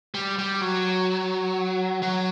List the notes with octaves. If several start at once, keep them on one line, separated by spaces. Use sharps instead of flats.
G3
G3
F#3
F#3